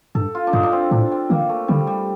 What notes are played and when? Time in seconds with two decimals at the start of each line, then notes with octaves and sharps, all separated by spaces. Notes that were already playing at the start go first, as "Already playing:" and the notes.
0.15 G2 A4
0.35 F4
0.47 D4
0.53 G2 D#4
0.63 D4
0.72 C4
0.91 A2 D4
1.12 C4
1.30 D#3 A#3
1.49 A3
1.68 D3 G3
1.87 G3